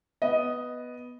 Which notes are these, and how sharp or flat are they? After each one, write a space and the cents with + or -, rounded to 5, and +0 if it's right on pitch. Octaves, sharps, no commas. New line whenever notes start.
B3 +0 D#5 +0